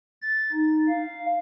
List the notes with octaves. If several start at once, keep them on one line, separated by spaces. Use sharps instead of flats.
A6
D#4
F5